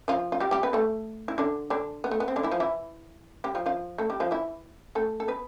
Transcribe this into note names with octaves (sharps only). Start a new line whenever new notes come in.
F3 F4
F4
G3 G4
G3 G4
B3 B4
A3 A4
E4
D3 D4
D3 D4
B3
A3
B3
C4
D3 D4
E3 E4
F3 F4
E3 E4
G3 G4
F3 F4
F3 F4
A3 A4
G3 G4
F3 F4
E3 E4
A3 A4
A4
B3 B4